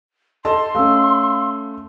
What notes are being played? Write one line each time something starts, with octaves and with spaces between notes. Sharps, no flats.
A4 D#5 A5 C6
A3 C#4 F5 E6